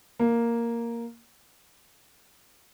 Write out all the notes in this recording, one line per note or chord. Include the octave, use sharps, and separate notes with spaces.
A#3